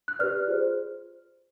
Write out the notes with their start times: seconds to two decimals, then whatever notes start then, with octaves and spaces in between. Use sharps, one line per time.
0.08 F#6
0.19 G4 B4 D5 F6
0.47 F4 G#4 C5